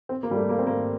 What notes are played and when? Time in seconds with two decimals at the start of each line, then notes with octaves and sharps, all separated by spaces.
0.09 C4
0.23 A#3
0.31 G3
0.36 A3
0.49 A#3
0.59 C4
0.67 A#3